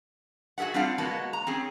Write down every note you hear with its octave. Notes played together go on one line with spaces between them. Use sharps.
F#4 G#4 A4 E5 F#5
G3 C4 D4 F4 F5 F#5
G#3 A#3 B3 F#4 A5
A#5
C4 C#4 G#4